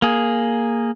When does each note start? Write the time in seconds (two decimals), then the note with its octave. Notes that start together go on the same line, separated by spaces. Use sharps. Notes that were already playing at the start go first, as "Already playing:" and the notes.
0.02 A#3 G#4